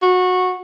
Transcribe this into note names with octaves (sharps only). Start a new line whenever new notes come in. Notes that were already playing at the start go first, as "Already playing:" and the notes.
F#4